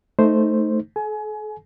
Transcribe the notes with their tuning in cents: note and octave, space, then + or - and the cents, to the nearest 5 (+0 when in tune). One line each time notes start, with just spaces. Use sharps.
A3 +0 D#4 +0 C5 +0
A4 -45 G#5 +30